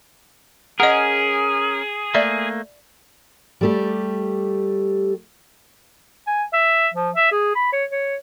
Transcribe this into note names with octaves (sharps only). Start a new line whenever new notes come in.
C#4 G#4 A#4 D#5 F#5
A3 A#3 D5 E5
G3 A3 G4
G#5
E5
F3
E5
G#4
B5
C#5
C#5